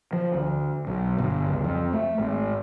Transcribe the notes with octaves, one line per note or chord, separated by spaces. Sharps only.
F3
D2
B1
G1
C#2
F2
A3
G#1